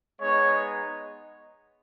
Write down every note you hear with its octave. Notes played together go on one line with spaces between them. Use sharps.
G#3 B3 D#4 C#5